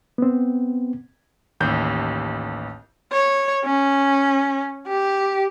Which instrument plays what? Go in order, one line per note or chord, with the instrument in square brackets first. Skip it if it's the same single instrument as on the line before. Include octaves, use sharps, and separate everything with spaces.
[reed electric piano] B3 C4
[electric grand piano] A1 D#2 G6
[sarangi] C#5
C#4
G4